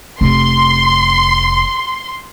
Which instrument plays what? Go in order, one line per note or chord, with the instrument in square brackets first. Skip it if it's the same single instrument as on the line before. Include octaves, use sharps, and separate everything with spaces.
[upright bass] F1 [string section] C6